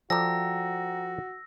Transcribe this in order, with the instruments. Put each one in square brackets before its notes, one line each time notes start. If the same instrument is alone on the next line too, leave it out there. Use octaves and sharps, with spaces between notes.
[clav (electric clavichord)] F3 A4 D5 [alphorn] F#4 [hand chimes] G5 A#5 [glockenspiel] E6 A#6